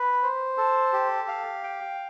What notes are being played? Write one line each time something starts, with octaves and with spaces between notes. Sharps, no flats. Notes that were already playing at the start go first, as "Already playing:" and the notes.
Already playing: B4
C5
A4
G4
F5
G5